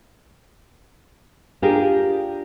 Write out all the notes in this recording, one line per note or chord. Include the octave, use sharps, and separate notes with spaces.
D4 F4 G4 G#4 A#4